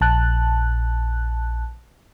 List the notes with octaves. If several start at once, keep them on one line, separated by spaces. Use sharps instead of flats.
A#1 A5 F#6